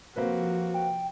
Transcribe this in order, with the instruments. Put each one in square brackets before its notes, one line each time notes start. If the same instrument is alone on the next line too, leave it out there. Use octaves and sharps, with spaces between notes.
[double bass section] C3 F3 [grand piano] A#3 C4 B4 [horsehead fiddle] F#4
[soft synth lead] G5